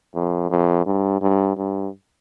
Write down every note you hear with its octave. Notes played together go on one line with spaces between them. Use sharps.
F2
F2
G2
G2
G2